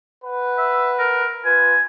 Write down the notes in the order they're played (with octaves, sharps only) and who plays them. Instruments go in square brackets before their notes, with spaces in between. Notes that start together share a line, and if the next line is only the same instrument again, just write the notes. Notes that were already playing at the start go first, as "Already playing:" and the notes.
[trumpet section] B4 F#5
[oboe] E5
A#4
[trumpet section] F4 B4 [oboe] G#5